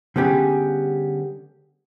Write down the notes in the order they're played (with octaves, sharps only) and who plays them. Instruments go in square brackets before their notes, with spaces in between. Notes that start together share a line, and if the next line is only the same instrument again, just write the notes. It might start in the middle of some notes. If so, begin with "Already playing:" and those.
[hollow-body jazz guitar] D3 G3 B3 C#4 G4 G#4